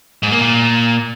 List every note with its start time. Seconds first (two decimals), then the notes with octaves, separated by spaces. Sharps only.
0.23 G#2
0.31 A#3
0.40 A#2